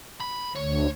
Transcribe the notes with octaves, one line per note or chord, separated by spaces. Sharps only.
B5
D2 C#5